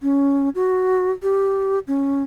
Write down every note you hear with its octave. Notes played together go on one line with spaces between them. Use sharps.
C#4
F#4
G4
C#4